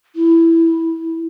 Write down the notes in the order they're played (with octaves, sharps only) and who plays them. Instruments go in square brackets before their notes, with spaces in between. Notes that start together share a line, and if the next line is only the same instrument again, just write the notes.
[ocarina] E4